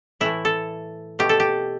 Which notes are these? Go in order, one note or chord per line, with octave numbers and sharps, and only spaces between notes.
A2 E3 A3 E4
A4
B2 A3 G4
A4
G4